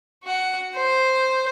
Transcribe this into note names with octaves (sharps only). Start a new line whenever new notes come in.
F#4 F#5
C5